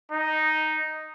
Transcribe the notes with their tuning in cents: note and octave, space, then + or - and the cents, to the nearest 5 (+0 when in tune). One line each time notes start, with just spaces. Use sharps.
D#4 +0